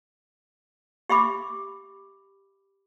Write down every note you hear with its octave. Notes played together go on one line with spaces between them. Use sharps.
G4 E5 B5 D6